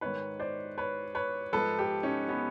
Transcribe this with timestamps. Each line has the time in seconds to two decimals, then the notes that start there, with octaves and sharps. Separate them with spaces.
0.01 G#2 D#3 B4 C#5
0.39 C5 D5
0.78 B4 C#5
1.15 B4 C#5
1.53 G#2 F3 A4 B4
1.79 G4 A4
2.03 C#4 D#4
2.28 B3 C#4